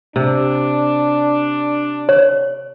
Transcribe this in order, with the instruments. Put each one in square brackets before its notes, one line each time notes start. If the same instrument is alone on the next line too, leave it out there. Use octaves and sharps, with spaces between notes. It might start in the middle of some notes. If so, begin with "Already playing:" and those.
[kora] C3 [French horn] D4
[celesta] C#5